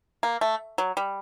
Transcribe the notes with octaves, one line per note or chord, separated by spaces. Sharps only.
A#3
A3
F#3
G3